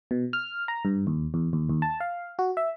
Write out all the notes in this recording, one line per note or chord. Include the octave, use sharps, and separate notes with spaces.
B2
F6
A#5
G2
D#2
E2
D#2
D#2
A5
F5
F#4
E5